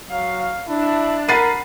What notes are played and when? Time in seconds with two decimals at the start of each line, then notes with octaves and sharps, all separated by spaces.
0.11 F#3 F5
0.68 D4 E4
1.28 A#4 F#5 B5 A6 C7 D#7